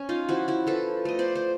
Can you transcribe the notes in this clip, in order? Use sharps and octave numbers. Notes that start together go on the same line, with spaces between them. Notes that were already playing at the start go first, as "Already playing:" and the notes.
Already playing: C#4
D#4 F4
F3 E4 F#4
E4 F#4
F3 A4 B4
A3 D#5
C5 D5
C5